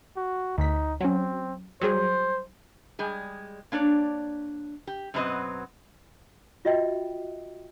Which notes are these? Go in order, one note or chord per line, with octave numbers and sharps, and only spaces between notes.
F#4
D2 D#4 B6
F#3 C4 C#4
F#3 G3 G#4 C5
G3 G#3 G#4
A#3 D4 C#5 D5
G4
F#2 B2 F#3 C4 B4 D#5
F4 F#4 D#5 E5 G5